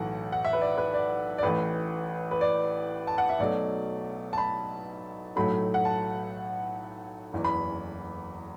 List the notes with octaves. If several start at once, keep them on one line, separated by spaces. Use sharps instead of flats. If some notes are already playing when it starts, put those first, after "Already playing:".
Already playing: B1 A2 E3 A3 F#5 A5
F#5
E5
B4
D5
B4
D5
D5
A1 A2 E3 B4
B4
D5
A5
F#5
E5
B1 B2 F#3 A3 D5
A5
B5
B1 A2 F#3 A3 B5
F#5
A5
F#1 E2 E3
B5